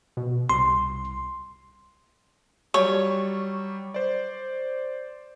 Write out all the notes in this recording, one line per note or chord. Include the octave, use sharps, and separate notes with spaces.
B2
C2 C6
F#3 G3 C#5
C5 D5